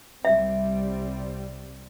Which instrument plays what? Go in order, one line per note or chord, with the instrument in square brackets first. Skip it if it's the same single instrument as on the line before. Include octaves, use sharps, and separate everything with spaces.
[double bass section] C2 G3 C4 [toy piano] E5